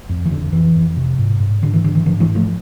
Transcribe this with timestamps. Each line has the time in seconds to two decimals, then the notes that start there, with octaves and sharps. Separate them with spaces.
0.09 F2
0.25 E3
0.30 F2 D3
0.52 F2 E3
0.75 F2
0.96 C3
1.18 G#2
1.40 G#2
1.62 G#2 D3
1.73 E3
1.84 G#2 D3
1.95 E3
2.05 G#2 D3 F3
2.20 E3 G#3
2.29 G#2
2.35 F3 A3